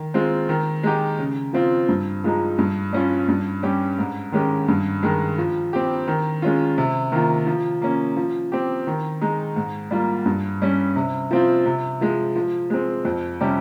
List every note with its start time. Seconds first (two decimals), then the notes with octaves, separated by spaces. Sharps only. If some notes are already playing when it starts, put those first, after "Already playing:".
Already playing: D#3
0.14 G#3 C4 F4
0.49 D#3
0.83 G#3 D#4 G4
1.18 C#3
1.53 F3 C4 F4
1.89 G2
2.24 F3 G#3 D#4
2.58 G2
2.93 G3 C#4 F4
3.28 G2
3.63 G3 C#4 G4
3.99 G#2
4.32 D#3 G#3 C#4 G4
4.68 G2
5.03 D#3 G#3
5.38 F3
5.73 C4 G4
6.07 D#3
6.42 G#3 C#4 F4
6.78 C3
7.12 D#3 A#3 F4
7.46 F3
7.82 A#3 C#4
8.16 F3
8.52 C4 G4
8.87 D#3
9.21 G#3 D#4
9.56 G#2
9.91 G3 A#3 F4
10.26 G2
10.62 G3 C#4
10.96 C3
11.31 F3 C4 F4
11.66 C3
12.01 F3 G#3
12.35 F3
12.70 G#3 C4
13.05 F2
13.40 C3 G3 C#4 G4